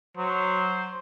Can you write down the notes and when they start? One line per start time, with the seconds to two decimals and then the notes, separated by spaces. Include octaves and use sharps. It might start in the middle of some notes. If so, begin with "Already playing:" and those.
0.17 F#3 C5